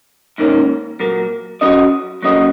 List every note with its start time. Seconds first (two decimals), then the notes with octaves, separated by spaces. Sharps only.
0.38 G#2 D#3 A#3 C#4
1.00 A#2 F#3 A#3
1.61 F#3 C#4 F#4 D#5
2.22 F#3 A#3 C#4 F#4 D#5